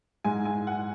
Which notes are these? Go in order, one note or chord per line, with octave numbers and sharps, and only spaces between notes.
G#2 G#3 G#5
G#5
F#5